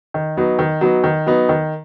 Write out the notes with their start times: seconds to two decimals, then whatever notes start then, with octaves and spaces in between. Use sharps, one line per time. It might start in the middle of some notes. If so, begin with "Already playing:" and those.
0.14 D#3
0.37 F#3 B3 D#4
0.59 D#3
0.81 F#3 B3 D#4
1.04 D#3
1.27 F#3 B3 D#4
1.49 D#3